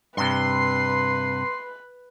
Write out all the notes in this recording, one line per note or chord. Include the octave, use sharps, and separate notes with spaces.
G2 C3 B4 C6